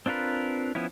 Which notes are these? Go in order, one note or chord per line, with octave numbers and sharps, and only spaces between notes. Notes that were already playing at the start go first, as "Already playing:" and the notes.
C4 D4 F4 A#4 B4
F3 B3 C#4 E4